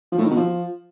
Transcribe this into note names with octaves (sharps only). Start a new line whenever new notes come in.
F3
A2
D#3
B2
F3